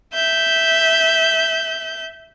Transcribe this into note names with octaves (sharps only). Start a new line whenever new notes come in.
E5 G6